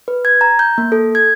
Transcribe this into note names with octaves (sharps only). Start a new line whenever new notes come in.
B4
G#6
A#5
G6
A#3
A4
G#6